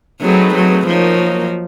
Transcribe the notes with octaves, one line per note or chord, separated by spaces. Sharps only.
F#3 A3 C4 D#4 G#4 B4
F#3
F3 F#3 A#3 D#4